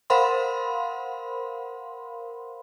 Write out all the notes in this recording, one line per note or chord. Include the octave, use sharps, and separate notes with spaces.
A#4 C5 F5 F#5 B5 C6